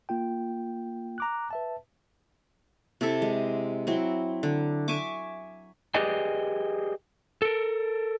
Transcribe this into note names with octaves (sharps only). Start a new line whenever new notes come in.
A#3 F4 G5
A#5 D6 F#6
B4 E5 A5
C3 E4 A4 E5
G#3
F#3 C4 E4
D3
E5 G#5 C#6 D6
G4 G#4 B4 D5 D#5 G#5
A4 A#4